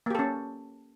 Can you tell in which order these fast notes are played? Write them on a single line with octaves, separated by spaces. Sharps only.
A#3 G4 A4 C#4